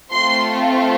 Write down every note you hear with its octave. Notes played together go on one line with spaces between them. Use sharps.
A3 C4 F4 C6